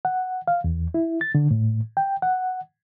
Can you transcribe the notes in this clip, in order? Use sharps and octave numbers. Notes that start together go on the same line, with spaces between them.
F#5
F5
E2
E4
A6
D3
A2
G5
F#5